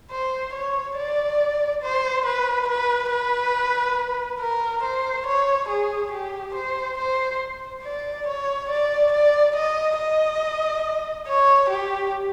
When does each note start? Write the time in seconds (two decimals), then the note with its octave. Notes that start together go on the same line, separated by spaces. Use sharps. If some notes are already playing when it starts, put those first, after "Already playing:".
0.11 C5
0.54 C#5
0.97 D5
1.83 C5
2.25 B4
2.68 B4
3.11 B4
4.40 A#4
4.83 C5
5.26 C#5
5.68 G#4
6.12 G4
6.54 C5
6.97 C5
7.83 D5
8.27 C#5
8.69 D5
9.12 D5
9.55 D#5
9.98 D#5
11.27 C#5
11.70 G4